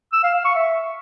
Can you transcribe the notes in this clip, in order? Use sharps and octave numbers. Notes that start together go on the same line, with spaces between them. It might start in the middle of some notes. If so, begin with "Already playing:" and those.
E6
F5
F5
C#6
E5